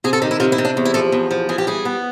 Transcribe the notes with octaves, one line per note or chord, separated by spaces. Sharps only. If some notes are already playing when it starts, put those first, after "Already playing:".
C3 G#4
A4
D#3 G4
E4
C3 F4
E4
C3
D4
E2
E4
F3 A4
E2
F3
E3 G#4
G4
G3 G#4
B3